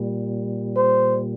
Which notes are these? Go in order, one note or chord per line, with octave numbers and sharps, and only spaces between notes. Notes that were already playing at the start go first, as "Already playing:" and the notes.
Already playing: A#2 G3
C5